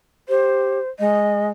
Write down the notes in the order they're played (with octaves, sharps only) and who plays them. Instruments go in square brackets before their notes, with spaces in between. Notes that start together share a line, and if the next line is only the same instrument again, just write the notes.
[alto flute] G4 [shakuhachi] C5
[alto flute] G#3 [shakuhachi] D#5